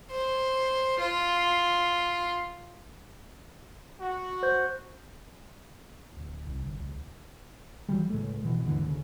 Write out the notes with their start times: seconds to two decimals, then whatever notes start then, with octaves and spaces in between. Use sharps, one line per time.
0.11 C5
0.99 F4
4.00 F#4
4.43 C5 G6
6.16 D1
6.47 C2
6.63 G1
6.79 C#2
7.89 E3 F#3 G3
8.09 C#2 A2 G#3 A3
8.43 B2 E3 F3
8.65 D#2 G#2 D3 E3
8.84 D2 C#3